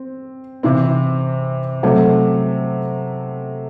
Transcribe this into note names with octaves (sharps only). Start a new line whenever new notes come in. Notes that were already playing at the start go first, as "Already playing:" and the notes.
Already playing: C4
C3 E3 C4
C3 F#3 A3